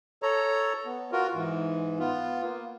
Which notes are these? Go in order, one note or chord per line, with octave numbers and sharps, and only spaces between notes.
A4 C#5 A#5
B3
F4 F#4 A#4
G#2 E3
B3 F4
A#3